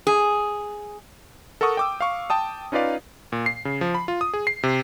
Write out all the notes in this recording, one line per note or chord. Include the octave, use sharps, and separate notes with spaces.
G#4
A4 A#4 F#5 C#6 D#6
G5 D6 E6
F5 C#6
G5 A5 D#6
C#4 D#4 F4 B4 D5 F5
A#2
C7
C#3
F3
B5
F4
D#6
G#4
C7
C3